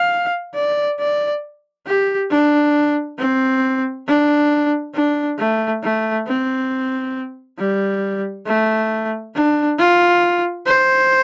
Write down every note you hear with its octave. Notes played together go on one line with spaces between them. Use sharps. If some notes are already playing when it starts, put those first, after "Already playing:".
Already playing: F5
D5
D5
G4
D4
C4
D4
D4
A3
A3
C4
G3
A3
D4
F4
C5